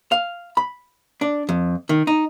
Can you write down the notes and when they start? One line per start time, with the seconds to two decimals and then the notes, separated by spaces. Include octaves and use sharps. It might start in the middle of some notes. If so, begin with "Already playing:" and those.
0.12 F5
0.57 B5
1.21 D4
1.49 F2
1.89 D#3
2.07 D#4